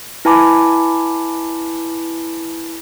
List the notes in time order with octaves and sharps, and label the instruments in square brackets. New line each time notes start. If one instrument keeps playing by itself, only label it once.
[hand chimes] E4 B4 G#5 A5 B5 D6